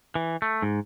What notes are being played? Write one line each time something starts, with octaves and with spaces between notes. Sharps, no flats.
E3
A3
G#2